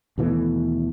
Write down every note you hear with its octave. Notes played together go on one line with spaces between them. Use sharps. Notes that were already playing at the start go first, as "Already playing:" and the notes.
D#2 B2 E3 A3